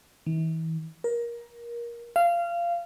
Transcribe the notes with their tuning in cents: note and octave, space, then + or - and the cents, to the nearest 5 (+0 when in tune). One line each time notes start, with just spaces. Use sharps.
E3 -40
A#4 +20
F5 -20